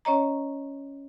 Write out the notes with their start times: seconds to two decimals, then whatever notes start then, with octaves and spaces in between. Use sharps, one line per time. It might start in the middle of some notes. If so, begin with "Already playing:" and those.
0.05 C#4 C#5 D#5 A#5